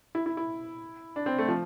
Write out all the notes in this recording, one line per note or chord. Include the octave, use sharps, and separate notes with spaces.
E4
E4
E4
D4
C4
A3
F3